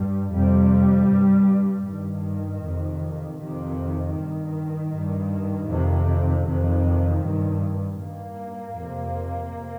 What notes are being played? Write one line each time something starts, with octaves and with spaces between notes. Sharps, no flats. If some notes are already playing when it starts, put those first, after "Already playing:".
Already playing: G2 G3
F2 C3 G3
G2
G2 D#3
F2 C3
F2 C3 D#3
G2
G2
F2 C3
F2 C3 D#3
G2
G2 A#3
F2 C3